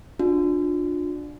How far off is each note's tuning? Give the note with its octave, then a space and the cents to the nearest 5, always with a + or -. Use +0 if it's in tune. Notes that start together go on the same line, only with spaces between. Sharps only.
D4 +10 F4 +35